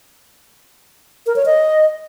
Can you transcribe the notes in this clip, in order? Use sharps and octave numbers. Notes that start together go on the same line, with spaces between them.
A#4
C#5
D#5